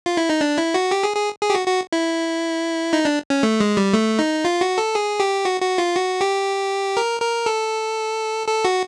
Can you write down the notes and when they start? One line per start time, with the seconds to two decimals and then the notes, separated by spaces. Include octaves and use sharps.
0.06 F4
0.17 E4
0.30 D#4
0.41 D4
0.58 E4
0.74 F#4
0.91 G4
1.03 G#4
1.16 G#4
1.42 G#4
1.50 G4
1.55 F#4
1.67 F#4
1.92 E4
2.93 D#4
3.05 D4
3.30 C#4
3.43 A3
3.60 G#3
3.77 G3
3.94 A3
4.19 D#4
4.45 F4
4.61 F#4
4.78 A4
4.95 G#4
5.20 G4
5.45 F#4
5.61 F#4
5.78 F4
5.95 F#4
6.21 G4
6.97 A#4
7.21 A#4
7.46 A4
8.48 A4
8.65 F#4